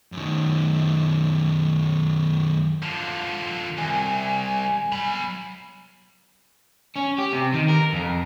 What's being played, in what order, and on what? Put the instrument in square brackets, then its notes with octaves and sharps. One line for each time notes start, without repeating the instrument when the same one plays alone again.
[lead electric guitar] F#2 D#3
[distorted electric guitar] D3 F3
[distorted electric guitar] C2 [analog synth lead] G#5
[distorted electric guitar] F#3 B5
[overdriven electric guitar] C#4
G4
C3
D#3
A#4
F2